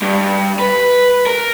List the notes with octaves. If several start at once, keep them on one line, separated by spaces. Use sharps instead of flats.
G2
B4
A#4